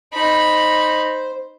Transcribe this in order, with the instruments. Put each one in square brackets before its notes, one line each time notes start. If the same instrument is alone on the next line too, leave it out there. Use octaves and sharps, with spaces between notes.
[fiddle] D#4 B5 [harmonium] C5